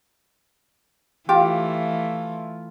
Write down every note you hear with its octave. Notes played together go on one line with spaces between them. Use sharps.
E3 A3 F4 G4